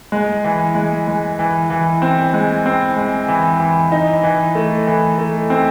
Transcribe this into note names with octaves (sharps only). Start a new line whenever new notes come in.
G#3
E3
G#3
G#3
E3
E3
C4
G#3
C4
G#3
E3
E3
D#4
E3
A3
E3
A3
C4